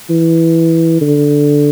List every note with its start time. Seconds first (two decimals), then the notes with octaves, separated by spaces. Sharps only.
0.10 E3
1.02 D3